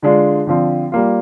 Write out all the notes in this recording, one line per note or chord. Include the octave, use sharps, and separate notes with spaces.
D3 G#3 D4 F4
D3 F3 C4 F4
G3 A#3 F4